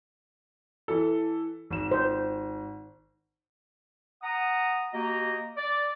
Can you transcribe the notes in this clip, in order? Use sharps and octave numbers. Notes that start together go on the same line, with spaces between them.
E3 A4
G#1 E7
C5
F#5 A#5 D#6
A#3 F#4 G4 D#5 A#5
D5